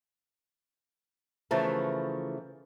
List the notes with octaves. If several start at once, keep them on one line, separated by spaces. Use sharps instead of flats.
C#3 E3 F3 A3 A#4